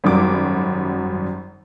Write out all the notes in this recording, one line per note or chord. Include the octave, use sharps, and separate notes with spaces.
G#1 F#2 F#3 G3 D6